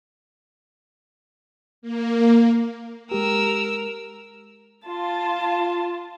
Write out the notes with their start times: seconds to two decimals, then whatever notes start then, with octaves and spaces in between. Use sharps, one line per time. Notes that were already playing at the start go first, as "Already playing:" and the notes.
1.82 A#3
3.12 G#3 G4 A#4 E6
4.87 F4 A5